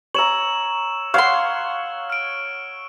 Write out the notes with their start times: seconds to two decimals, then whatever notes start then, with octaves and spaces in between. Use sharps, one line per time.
0.14 C#5 A#5 E6 E7 F#7
1.14 C#5 F5 F#5 C6 F6
2.10 F6 D7